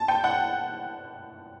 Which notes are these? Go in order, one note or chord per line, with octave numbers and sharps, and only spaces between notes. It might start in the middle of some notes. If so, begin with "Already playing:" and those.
Already playing: A5
G5
F#5